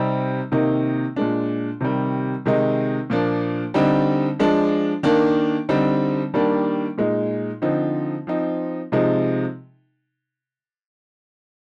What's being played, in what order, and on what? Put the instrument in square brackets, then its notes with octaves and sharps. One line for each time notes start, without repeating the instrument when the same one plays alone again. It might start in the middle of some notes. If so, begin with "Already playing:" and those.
Already playing: [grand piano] C3 G3 C4 D#4
C3 D#3 A#3 D#4
A#2 G#3 D4
C3 D#3 G3
C3 D#3 G#3 D#4
A#2 F3 A#3 D4
D3 G3 C4 D#4
F3 G#3 D4
D#3 A#3 D4
D3 G3 C4 D#4
D#3 G3 A#3 D4
A#2 G#3 D#4
D3 F3 C4 D#4
F3 C4 D#4
C3 F3 G#3 D#4